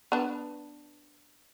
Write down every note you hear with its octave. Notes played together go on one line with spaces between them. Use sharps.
B3 D4 B4